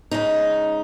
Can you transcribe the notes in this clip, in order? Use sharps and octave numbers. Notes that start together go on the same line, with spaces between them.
C#3 G#3 D#4